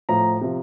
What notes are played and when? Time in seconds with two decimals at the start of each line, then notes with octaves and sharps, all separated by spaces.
0.09 A2 F3 A#5
0.41 C3 F3